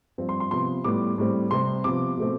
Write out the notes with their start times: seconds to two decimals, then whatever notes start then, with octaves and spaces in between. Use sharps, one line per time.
0.18 G2 F3 C4
0.29 C6
0.40 C6
0.51 C3 F3 B3 C6
0.84 A2 G3 B3 D6
1.18 A2 G3 C4
1.51 C3 G3 C4 C6
1.84 C3 F3 B3 D6
2.17 B2 A3 C4